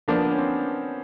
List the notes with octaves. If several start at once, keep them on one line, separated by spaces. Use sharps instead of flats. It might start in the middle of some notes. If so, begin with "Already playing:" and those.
F3 A#3 B3 D4
B3
C#4
C4